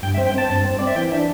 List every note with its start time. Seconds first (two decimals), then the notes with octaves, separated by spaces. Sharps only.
0.02 G2 G5
0.14 E5
0.18 C4
0.27 G5
0.34 C4 A5
0.50 G2
0.65 C4
0.79 C4 D5
0.87 E5
0.96 E3 G5
1.11 D4 E5